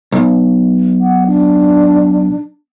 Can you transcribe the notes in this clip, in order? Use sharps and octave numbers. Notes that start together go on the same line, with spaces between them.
B1
F#5
D4